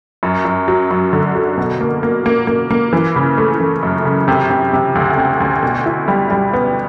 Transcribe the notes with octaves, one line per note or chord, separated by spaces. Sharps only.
F#2
F#2
F#3
F#2
D3
F#3
B2
A#3
A#3
A#3
A#3
A#3
E3
C#3
A3
E3
F#2
C#3
C3
C3
C3
D2
C3
D2
B2
E4
G3
G3
B3